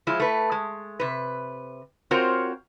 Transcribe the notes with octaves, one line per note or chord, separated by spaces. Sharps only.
F3 G#3 E4
A3 B4
G#3
C3 B4
C4 F4 F#4 A#4 C5 C#5